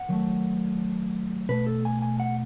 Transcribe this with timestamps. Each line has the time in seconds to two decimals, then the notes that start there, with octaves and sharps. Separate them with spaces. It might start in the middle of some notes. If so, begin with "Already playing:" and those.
Already playing: F#5
0.09 D#3 F#3 A3
1.49 B2 A3 B4
1.67 A4
1.85 G#5
2.02 G#5
2.20 F#5